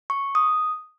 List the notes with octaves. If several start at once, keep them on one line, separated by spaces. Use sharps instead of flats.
C#6
D#6